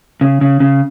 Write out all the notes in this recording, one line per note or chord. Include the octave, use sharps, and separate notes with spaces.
C#3
C#3
C#3